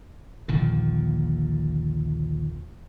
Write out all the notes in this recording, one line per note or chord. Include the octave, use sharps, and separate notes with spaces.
A#1 D#2 A#2 D3